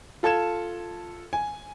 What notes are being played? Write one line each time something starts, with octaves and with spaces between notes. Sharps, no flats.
F4 A4 A5 G#6 E7
G#5